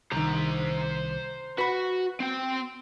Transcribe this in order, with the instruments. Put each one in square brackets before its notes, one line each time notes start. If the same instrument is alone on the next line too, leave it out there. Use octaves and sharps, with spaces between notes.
[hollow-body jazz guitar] C2 D#3 [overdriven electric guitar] C5 A#5
[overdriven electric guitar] F#4 [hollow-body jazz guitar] B4 B5
[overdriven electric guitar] C4 G5